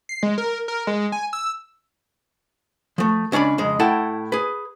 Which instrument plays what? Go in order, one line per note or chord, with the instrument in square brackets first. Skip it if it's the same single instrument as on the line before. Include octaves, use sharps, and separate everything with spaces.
[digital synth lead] C7
G#3
A#4
A#4
G#3
G#5
E6
[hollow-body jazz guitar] F3 A3
C#2 C#4 D4 D5 B5
F2 C#3 G#3
A2 E4 A4 F#5 G5 A5
G#4 B4